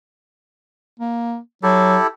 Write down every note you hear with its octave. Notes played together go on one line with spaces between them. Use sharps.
A#3
F#3 E4 G4 A4